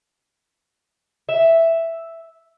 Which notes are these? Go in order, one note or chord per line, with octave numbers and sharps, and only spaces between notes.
E5